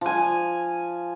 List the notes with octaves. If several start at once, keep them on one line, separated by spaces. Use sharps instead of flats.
F3 G#5